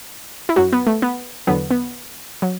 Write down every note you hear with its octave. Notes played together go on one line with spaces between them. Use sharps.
E4
F#2 F#3 F#4
B3
A3
B3
E2 D3 F#3 B3
B3
F#3